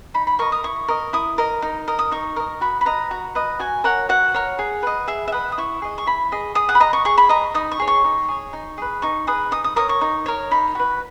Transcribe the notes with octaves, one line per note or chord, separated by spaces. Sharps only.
D#4 B5
B5
A#4 D#5 C#6
D#6
E4 C#6
A#4 D#5
E4 D#6
A#4 D#5
D#4
A#4 D#5
D#6
D#4 C#6
A#4 D#5
F#4 B5
B5
B4 D#5 A#5
F#4
B4 D#5
F#4 G#5
A#4 C#5 F#5
F#4 F#5
A#4 C#5
G#4
B4 D#5
G#4 E5
E5
B4 D#5 F#5
D#6
E4 C#6
G#4 D#5
C#6
E4 B5
G#4 D#5
G#4 D#6
F#5
B5
D#5 A#5
C#6
G#4 C#6
B5
D#5 A#5
D#4 D#6
C#6
G#4 C#5
C#6
D#4
G#4 C#5
D#4
G#4 B4
D#4 C#6
G#4 B4 D#6
D#4 D#6
D#6
A#4 C#5 D#6
C#6
D#4
A#4 C#5
D#4 B5
F#4 B4